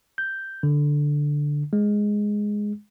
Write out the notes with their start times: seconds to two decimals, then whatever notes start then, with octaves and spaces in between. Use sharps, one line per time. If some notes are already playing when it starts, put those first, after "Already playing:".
0.18 G6
0.63 D3
1.73 G#3